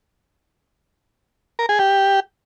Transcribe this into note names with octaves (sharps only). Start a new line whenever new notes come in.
A#4
G#4
G4